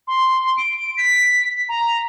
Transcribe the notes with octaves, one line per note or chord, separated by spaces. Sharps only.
C6
D7
B6
A#5